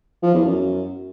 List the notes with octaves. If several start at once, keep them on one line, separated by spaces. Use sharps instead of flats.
F3
E2
F#2